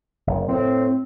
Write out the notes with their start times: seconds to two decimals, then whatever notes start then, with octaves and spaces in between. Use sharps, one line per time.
0.27 F#1
0.48 A2 C4